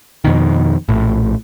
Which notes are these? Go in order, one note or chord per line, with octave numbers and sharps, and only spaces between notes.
F2 B2 D#3
A#1 A2